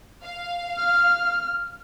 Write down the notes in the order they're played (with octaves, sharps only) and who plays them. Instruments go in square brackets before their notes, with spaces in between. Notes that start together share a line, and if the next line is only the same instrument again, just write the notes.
[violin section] F5
[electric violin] F6